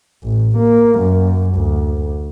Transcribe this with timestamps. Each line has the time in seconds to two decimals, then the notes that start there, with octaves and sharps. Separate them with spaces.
0.24 A1
0.58 A#3
1.00 F#2
1.56 D2